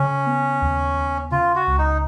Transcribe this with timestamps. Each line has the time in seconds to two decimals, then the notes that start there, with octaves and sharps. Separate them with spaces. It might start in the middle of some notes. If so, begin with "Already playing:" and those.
Already playing: C#3 C#4
0.26 B3
0.62 D#2
0.97 D#2
1.32 C#3 F4
1.55 F#4
1.67 C#2
1.79 D#4